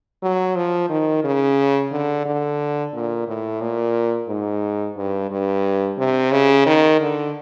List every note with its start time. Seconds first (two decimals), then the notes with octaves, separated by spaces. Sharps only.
0.23 F#3
0.56 F3
0.90 D#3
1.24 C#3
1.92 D3
2.25 D3
2.94 A#2
3.28 A2
3.61 A#2
4.29 G#2
4.97 G2
5.31 G2
5.98 C3
6.32 C#3
6.66 D#3
7.01 D3